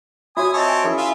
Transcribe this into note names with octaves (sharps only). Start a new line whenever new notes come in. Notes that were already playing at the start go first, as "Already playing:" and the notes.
F4 F#4 C#5 E5 G#5 D#6
C4 C#5 D#5 A5 D6
G#5
C#4 E4 G#4 A#4
F4 E5